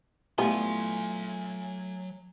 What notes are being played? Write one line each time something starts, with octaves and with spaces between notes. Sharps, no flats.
E3 F#3 G3 A3 B3 F4 G#5 C6